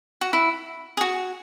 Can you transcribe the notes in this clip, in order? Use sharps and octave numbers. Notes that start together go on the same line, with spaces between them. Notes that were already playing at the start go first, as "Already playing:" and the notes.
F#4
E4
G#4
F#4